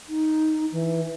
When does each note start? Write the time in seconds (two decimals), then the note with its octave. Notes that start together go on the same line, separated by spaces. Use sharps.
0.09 D#4
0.72 E3